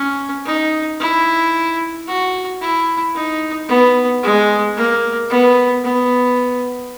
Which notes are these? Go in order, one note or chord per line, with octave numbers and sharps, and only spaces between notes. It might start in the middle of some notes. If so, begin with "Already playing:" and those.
Already playing: C#4
D#4
E4
F#4
E4
D#4
B3
G#3
A#3
B3
B3